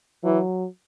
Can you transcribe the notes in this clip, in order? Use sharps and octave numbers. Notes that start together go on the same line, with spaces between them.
E3 F#3